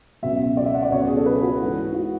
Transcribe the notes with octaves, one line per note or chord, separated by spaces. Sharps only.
C#2 B2 F#3 E5
D5
E5
F#5
D5
C#2 B2 F#3 C#5
G#4
A4
B4
F#4
G#2 E3
F#4